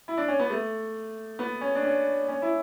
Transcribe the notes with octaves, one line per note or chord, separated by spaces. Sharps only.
E4
D4
C#4
B3
A3
B3
C#4
D4
C#4
C#4
E4